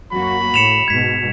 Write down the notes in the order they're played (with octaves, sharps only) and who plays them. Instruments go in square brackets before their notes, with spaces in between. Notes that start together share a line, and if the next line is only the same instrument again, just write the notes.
[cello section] F#2 A#3 F#4 [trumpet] B5
[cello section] A2 [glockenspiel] C#7 E7 F7
[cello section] G#2 B2 [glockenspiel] G#6 B6